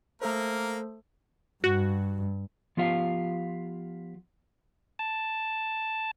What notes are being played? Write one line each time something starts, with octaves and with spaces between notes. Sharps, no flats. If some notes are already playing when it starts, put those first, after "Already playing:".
A3 A#3 A4 A#4 C5
G2 F#4
F3 B3 F4 G4 F5
A5